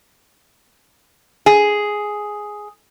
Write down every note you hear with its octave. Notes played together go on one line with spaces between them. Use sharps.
G#4